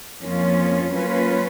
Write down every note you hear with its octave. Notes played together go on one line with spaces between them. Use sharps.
F2 F3 A#3 C#4 F4
F#3 A#3 C#4 F4 B4